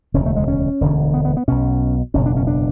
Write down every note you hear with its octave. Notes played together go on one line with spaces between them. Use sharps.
E1 D2 C#3 C#4
A3
G#3
C#4
E1 D2 D3
B3
B3
B3
B1 B2 C#4
F#1 E2 B2 C#4
D4
C#4
D4